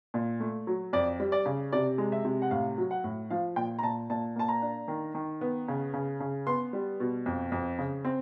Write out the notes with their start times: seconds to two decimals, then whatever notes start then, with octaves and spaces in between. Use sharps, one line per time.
0.14 A#2
0.40 A3
0.67 F#3
0.93 F2 D5
1.20 G3
1.32 D5
1.46 C#3
1.72 C3 D5
1.98 G#3
2.12 E5
2.25 C3
2.42 F#5
2.51 A2 F5
2.78 F#3
2.91 F#5
3.04 A2
3.30 F3 F5
3.56 A#2 G5
3.79 A#5
3.83 A#2 A5
4.10 A#2 A5
4.36 A#3 A5
4.49 A#5
4.62 D4
4.88 D#3
5.15 D#3
5.41 B3
5.68 C#3
5.94 C#3
6.20 C#3
6.47 B3 C6
6.73 G3
7.00 B2
7.26 F2
7.52 F2
7.79 C#3
8.05 C4